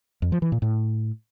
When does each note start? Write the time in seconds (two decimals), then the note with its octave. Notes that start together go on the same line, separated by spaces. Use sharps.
0.22 F2
0.32 F3
0.42 E3
0.52 A#2
0.62 A2